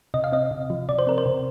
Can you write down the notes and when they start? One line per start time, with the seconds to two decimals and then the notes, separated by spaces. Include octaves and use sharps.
0.14 C3 D#5
0.24 F5
0.32 C4 D#5
0.51 C3
0.70 F3
0.89 C3 D5
0.99 C5
1.07 C4 A#4
1.18 C5
1.26 C3